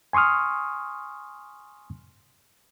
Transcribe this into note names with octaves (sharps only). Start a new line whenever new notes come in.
G#5 C6 C#6 D#6 F6